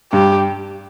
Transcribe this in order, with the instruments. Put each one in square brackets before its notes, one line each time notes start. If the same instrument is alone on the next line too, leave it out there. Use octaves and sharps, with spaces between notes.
[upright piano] G2 [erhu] G4